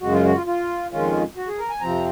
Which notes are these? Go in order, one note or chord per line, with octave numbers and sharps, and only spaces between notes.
F#2 C#3 G#3 F#4
F4
F#4
F4
F4
F2 D#3 G#3 C#4 F4
F#4
G#4
A#4
G#5
F2 C3 F3 C4 A#5